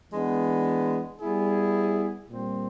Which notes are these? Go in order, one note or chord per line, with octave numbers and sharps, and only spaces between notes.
E3 G#3 B3 D4
G3 B3 E4 G#4
A#2 G3 C4